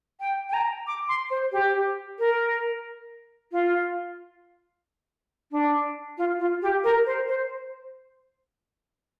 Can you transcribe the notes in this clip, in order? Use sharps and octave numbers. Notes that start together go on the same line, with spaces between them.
G5
G5
A#5
D6
C6
C5
G4
A#4
F4
D4
F4
F4
G4
A#4
C5
C5